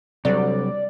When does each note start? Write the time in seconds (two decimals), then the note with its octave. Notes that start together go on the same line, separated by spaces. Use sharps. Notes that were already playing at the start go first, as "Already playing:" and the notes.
0.25 D2 C3 F#3 G3 D5